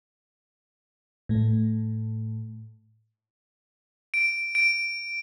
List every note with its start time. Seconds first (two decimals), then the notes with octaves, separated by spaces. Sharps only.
1.29 A2 A3
4.14 D7
4.55 D7